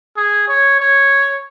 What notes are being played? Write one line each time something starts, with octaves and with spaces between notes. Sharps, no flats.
G#4
C#5
C#5